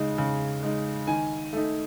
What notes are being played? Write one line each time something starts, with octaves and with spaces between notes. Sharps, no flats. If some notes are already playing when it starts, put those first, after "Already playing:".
Already playing: C#3 G#3 D#4
C#3
G#3 D#4
D#3 G#5
A3 D#4